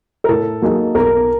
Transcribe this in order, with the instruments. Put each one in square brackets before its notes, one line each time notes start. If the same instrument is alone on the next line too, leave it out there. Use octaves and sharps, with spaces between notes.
[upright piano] A#4
[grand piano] A2 [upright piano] A4
[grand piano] F#3 A#3 D#4 G#4
[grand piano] B1 [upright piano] A#4